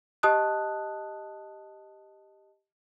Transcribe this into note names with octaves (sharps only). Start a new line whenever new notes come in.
G4 D#5 A5 D#6 F#6